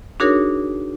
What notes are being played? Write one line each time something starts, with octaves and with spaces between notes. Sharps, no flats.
D4 D#4 F#4 G#4 A#4 C#5